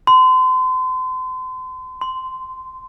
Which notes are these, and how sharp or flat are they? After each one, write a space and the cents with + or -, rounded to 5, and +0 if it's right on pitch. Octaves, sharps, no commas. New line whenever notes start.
C6 -35
C6 -15